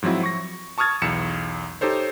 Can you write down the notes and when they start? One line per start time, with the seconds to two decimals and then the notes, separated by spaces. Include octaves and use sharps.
0.02 G#2 F3 F#3 C4 E4
0.23 C#6 A#6
0.78 A5 C#6 D#6 F6 G#6 A6
1.02 B1 E2 C#7 E7
1.81 D#4 G4 A4 C5 C#5